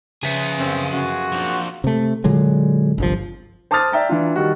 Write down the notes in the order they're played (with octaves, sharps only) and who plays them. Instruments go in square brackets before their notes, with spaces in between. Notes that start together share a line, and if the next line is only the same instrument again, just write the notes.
[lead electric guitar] C#3 [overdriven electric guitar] G#4 E5 [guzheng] B4 C5
[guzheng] F#2 G3 F5 [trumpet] C4
[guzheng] F#2 F4 [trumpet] F#4
[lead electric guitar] F3 D4 [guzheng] A#3 C4 F4
[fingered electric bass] C3 A3
A#2 D3 F#3 G#3
G1 C2 F3
[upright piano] C5 A5 D6 D#6 F6 A6
D5 E5 G5 A#5
E3 D4 F4
D#3 G3 F#4